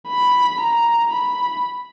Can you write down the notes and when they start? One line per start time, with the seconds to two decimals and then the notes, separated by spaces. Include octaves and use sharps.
0.09 B5
0.61 A#5
1.13 B5